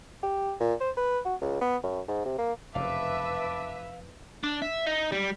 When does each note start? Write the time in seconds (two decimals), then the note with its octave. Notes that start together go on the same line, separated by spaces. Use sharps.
0.23 G4
0.60 A#2
0.80 C5
0.97 B4
1.25 F#4
1.41 C#2
1.61 B3
1.83 F#2
2.08 G#2
2.25 C3
2.38 A#3
2.75 F1 F#2 C#3 B4 E5 F5 A5 D6
4.44 D4
4.62 E5
4.86 D#4
5.12 G3